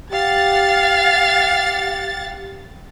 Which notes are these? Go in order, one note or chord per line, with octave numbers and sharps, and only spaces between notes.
G4 F5 F#5 A6